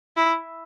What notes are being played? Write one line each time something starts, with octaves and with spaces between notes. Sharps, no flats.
E4